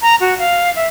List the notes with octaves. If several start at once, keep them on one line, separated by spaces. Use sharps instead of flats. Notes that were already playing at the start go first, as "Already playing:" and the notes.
A#5
F#4
F5
E5